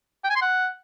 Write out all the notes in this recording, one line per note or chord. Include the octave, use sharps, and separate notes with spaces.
G5
G#5
C6
F#5